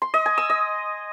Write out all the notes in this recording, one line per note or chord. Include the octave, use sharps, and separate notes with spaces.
C6
D#5
G#5
E6
D#5